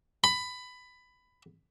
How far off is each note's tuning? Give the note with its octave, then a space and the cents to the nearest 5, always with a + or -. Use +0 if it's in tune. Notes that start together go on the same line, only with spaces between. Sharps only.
B5 +15